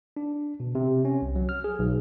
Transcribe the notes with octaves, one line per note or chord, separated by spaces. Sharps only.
D4
B2
C3
C#4
C2
F#3
F6
G#4
B1